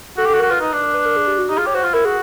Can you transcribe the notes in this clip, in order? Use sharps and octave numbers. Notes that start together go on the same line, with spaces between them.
F#4 A4
G4
F#4 A4
F#4 A#4
F4 B4
D#4
D4
A#4
B4
A#4
G#4
G4
F#4
D#4 G4
F4 G#4
G4 C#5
F#4 C5
F4
E4 A#4
F#4 G#4